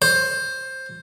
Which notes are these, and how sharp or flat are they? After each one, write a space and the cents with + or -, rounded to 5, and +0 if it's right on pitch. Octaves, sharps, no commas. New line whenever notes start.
C5 +10